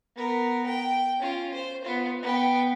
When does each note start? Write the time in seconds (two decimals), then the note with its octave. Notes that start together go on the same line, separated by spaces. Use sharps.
0.16 B3 A#4
0.67 G5
1.20 C#4 F4
1.54 C5
1.85 B3 F4
2.22 B3 G5